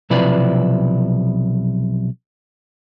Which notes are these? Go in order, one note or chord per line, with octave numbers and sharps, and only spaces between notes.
B1 C3 F3 E4 B4 D5